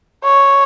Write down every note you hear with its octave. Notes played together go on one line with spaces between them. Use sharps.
C#5